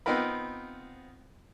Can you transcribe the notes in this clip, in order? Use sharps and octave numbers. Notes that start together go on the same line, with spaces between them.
B3 C4 D#4 F4 A#4 B4